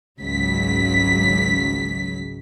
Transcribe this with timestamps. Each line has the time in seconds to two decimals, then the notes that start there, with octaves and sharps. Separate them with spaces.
0.22 G#1 C#2 F#3 B6